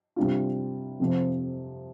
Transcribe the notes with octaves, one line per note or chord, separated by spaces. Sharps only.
C3 G3 D4 F4
F2 C3 F3